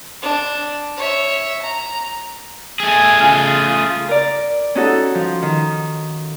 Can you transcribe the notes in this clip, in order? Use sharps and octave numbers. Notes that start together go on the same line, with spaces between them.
D4
C#5 E5
A#5
A3 G#4 G#5
C#3 C#4 F4
A#4 D5
C#4 D#4 F#4 A4
F3
D#3